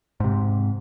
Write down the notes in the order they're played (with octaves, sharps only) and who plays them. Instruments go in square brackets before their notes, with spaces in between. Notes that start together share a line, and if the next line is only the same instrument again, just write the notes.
[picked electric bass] G#2 C3